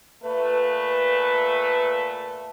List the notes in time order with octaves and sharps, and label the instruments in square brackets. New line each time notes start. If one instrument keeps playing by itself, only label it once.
[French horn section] A#2 A3 B4